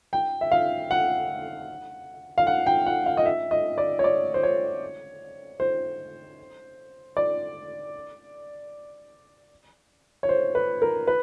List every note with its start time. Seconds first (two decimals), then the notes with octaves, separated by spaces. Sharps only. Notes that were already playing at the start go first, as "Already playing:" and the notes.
0.13 G5
0.41 E5
0.52 F5
0.91 F#5
2.38 F5
2.47 F#5
2.66 G5
2.86 F#5
3.06 F5
3.17 D#5
3.26 E5
3.51 D#5
3.78 D5
3.99 C#5
4.04 D5
4.34 C5
4.43 C#5
5.60 C5
7.17 D5
10.23 C#5
10.29 C5
10.55 B4
10.82 A#4
11.08 B4